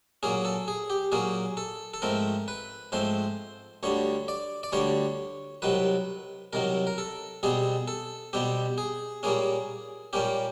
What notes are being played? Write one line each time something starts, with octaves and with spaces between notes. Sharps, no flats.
A#2 F#3 A#3 C#4 G#4
A4
G#4
G4
A#2 F#3 A#3 C#4 G#4
A4
A4
G#2 F3 A3 C4 A#4
B4
G#2 F3 A3 C4 C5
D2 D3 G3 C#5
D5
D5
D2 D3 G3 C#5
C2 C3 D#3 F#3 B4
C2 C3 D#3 F#3 A#4
A#4
A4
B2 G3 C4 G#4
A4
B2 G3 C4 G4
G#4
A#2 G3 A#3 C#4 G#4
A#2 G3 A#3 C#4 G4